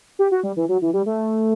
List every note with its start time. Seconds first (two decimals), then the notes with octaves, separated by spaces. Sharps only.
0.19 G4
0.31 F#4
0.43 G3
0.57 E3
0.69 F#3
0.82 E3
0.94 G3
1.06 A3